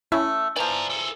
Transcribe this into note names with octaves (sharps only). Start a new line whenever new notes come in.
A3 C#4 E4
E3 F3 D5 A#5
G#4 A4